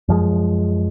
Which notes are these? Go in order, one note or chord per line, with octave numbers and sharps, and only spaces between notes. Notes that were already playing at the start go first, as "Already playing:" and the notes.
F#2 F3 G#3